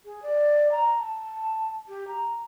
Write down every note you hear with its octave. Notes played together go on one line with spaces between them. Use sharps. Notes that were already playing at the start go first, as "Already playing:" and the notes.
G#4
D5
A#5
A5
G4
A#5